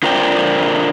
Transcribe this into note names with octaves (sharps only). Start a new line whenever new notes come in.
D3 F4 A#4 C5 D5 G5